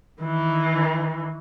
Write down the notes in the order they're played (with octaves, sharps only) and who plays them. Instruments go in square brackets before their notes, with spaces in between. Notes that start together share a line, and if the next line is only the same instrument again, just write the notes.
[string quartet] D#3 E3